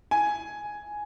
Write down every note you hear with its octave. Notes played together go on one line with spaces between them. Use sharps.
G#5